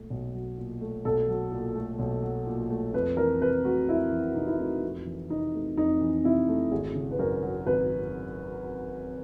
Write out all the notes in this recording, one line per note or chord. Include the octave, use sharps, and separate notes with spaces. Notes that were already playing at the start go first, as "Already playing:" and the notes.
Already playing: B1 A#2 F#3 A3
B1
F#3
A#2
A3
B1 A4
F#3
A#2
A3
B1
F#3
A#2
A3
F2 B4
E3 A#4
C3 B4
A3 F#4
F2 E4
E3
C3 D#4
E4
A3 D#4
F2
E3
C3 D#4
A3
F2 D#4
E3
C3 E4
A3
G#1 G#4
C#3
B4
F#2 A#4
F#3
G#1 B4